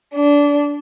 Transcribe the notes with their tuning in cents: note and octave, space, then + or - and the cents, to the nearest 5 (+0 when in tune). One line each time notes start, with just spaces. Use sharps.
D4 -20